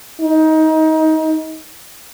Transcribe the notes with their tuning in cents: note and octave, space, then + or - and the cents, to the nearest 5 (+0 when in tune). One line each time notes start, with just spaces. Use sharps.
D#4 +25